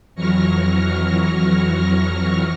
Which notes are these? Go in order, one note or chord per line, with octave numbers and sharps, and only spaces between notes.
F2 E3 F#3 C#6 F6 A#6